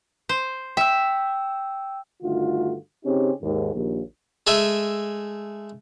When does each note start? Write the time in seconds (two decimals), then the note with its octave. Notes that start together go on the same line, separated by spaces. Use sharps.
0.29 C5
0.77 E5 G5 E6
2.23 G2 D3 D#3 A3 F4 F#4
3.05 C#3 C4 C#4 D#4 G4
3.42 D#2 G#2
3.74 A#1 D#2
4.47 G#3 A3 E5 G#5